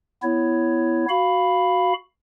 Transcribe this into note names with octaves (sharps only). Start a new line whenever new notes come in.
B3 E4 C#5
F#4 F5 B5